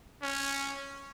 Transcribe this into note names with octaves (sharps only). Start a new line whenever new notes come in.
C#4